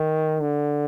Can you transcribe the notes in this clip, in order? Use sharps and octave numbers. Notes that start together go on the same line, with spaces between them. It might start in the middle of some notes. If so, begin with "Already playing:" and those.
Already playing: D#3
D3